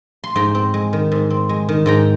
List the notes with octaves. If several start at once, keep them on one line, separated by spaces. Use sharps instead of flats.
C6
G#2 G5 A#5
C4
G#3
D#3
G#2
C4
G#3
D#3
G#2 G5 A#5